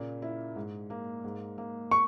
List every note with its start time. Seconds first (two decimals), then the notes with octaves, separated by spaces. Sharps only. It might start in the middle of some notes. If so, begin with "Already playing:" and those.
Already playing: A#2 C#3 A#3
0.22 E4
0.56 G#2
0.90 A#3
1.24 G#2
1.58 A#3
1.91 C#6